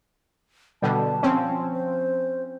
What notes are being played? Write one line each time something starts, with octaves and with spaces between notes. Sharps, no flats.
B2 D3 G3 A5
F3 C4 C#4
C5